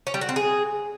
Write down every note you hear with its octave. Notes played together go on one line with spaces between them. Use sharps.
C#4
G3
F#4
C4
G#4